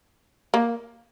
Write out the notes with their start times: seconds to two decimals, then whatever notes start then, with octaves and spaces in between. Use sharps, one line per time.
0.54 A#3